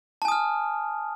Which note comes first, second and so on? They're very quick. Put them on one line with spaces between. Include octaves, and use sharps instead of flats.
A5 G#5 D#6 F6